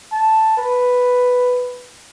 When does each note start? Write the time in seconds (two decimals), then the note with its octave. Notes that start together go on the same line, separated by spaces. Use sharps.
0.12 A5
0.57 B4